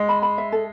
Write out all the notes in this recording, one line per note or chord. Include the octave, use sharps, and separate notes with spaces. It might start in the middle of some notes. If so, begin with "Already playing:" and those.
Already playing: G#3
B5
B5
E5
A4